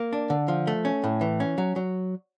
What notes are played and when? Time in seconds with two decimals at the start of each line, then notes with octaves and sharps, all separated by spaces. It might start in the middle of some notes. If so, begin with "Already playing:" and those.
Already playing: A#3
0.13 D4
0.30 D3
0.48 F3
0.67 A3
0.85 C#4
1.04 A2
1.21 E3
1.40 C#4
1.58 F#3
1.76 F#3